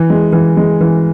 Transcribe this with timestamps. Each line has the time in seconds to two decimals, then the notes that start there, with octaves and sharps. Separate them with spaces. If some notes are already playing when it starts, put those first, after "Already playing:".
Already playing: E3
0.10 G#3
0.32 E3
0.57 G#3
0.81 E3